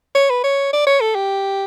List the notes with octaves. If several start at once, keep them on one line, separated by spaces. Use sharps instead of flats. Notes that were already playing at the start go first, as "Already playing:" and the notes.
C#5
B4
C#5
D5
C#5
A4
G4